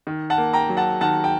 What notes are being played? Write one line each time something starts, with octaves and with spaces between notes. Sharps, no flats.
D#3
F#5 A5
A#3
G5 A#5
F#3
F#5 A5
D#3 F#5 A5
G5